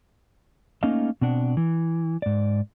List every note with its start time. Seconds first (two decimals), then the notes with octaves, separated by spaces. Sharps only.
0.83 A3 A#3 C#4 D#4 D#5 F5
1.21 B2 C4 D4 F#5
1.57 E3
2.22 G#2 D5